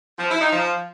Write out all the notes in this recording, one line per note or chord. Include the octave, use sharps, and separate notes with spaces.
F3
E4
D#4
F3